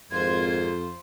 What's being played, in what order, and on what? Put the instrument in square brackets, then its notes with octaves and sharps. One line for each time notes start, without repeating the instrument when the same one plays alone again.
[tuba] G#1 [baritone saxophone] F2 [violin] F4 C5 [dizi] G#6